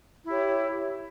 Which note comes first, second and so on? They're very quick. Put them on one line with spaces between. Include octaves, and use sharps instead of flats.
E4 G4 C#5